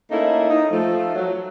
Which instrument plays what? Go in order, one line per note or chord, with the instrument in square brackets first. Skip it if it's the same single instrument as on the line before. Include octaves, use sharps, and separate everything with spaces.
[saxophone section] A3 A#3 C#4 D#4 E4
D#4
F3 A3
F#3